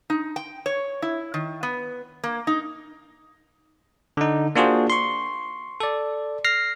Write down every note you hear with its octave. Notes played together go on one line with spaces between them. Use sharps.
D#4
G5
C#5
E4
D#3
B3
A#3
D#4
D3 D#4
A#3 D4 F4 F#4 G#4 C5
C6 C#6
A4 D5
F6 A#6 C7